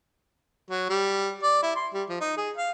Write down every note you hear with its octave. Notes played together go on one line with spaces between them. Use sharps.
F#3
G3
D5
E4
C6
G3
F3
D#4
G#4
F5